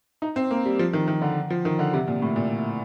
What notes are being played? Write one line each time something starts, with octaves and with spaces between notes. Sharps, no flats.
D#4
C4
A#3
G3
F3
D#3
D#3
D3
F3
D#3
D3
C3
A#2
A2
A#2